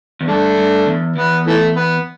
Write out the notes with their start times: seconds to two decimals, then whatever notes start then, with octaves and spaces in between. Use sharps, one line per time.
0.21 E2
0.28 G2 A3 D4
0.58 G2
0.86 E2
1.16 E2 B3
1.47 E3 A3
1.76 B3